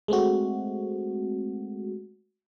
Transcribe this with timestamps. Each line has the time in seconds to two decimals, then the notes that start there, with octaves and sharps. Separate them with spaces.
0.08 G#3 A3 C4 F#4